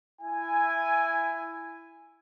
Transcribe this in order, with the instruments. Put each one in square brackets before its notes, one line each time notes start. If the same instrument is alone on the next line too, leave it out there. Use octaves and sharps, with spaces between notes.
[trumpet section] E4 G#5